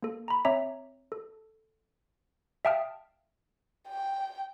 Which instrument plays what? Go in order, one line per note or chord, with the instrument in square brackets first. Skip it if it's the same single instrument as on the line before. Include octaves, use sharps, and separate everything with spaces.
[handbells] A#3 A4
A#5 B5
C4 C#5 E5 A#5 D6
A4
E5 F5 G5 A5 D#6 F6
[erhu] G5